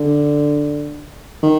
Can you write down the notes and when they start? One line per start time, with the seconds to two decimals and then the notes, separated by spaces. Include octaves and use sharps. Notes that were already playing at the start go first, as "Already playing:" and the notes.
Already playing: D3
1.43 D#3